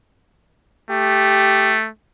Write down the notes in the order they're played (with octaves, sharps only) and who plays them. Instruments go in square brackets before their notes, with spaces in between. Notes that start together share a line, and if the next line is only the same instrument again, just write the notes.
[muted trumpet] A3 [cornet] G4